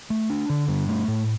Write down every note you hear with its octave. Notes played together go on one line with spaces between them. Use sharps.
A3
D4
D3
G2
A3
A2